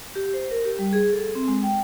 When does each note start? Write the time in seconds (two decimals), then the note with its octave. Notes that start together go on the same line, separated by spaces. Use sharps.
0.15 G4
0.34 C5
0.51 A#4
0.65 G4
0.79 G3
0.93 G#4
1.13 A4
1.35 C4
1.48 G#3
1.63 G5